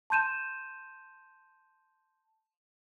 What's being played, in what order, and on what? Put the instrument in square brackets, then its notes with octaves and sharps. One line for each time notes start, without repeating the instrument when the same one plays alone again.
[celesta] A5 C6 G6 D#7 E7